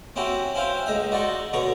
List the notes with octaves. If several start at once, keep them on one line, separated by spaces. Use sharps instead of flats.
C4 C#4 E4 F#4 G4
C#4 E4 C5 F5 G5
C#2 D#4 E5
D#4 F#4 D5 C6 C#6
B2 D3 C#5 A#5 C#6